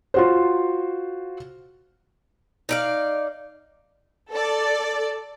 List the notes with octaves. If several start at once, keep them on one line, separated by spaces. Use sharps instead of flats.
F4 F#4 C5
D#4 D5 F5
A4 D5